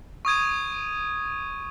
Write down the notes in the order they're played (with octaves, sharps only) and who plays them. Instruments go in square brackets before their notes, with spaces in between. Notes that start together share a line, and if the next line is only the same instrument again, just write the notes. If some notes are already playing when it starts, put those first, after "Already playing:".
[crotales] C#6 D#6 G#6 D#7